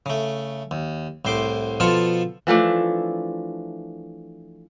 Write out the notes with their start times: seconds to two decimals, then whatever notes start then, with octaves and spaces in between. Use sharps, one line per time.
0.06 C#3 A3
0.71 D#2
1.25 C2 A2 C5 C6 D6
1.80 B2 F3 F4 A4 A5 C#6
2.47 E3 F3 A3 D4